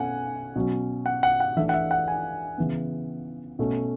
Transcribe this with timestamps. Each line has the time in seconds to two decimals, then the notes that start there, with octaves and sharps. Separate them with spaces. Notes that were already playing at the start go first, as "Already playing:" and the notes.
Already playing: B2 A3 C#4 F#5 G#5
0.56 B2 F#3 C#4
1.06 F#5
1.23 F#5
1.40 F#5
1.57 E3 A3 D4 E5
1.69 F#5
1.74 E5
1.91 F#5
2.08 G#5
2.58 C#3 E3 B3
3.59 B2 A3 C#4